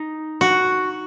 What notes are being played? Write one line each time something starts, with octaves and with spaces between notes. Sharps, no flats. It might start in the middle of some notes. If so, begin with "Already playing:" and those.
Already playing: D#4
F#4